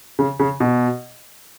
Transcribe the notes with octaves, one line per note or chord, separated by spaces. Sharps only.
C#3
C#3
B2